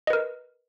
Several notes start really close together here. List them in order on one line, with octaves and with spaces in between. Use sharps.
D#5 B4 A#4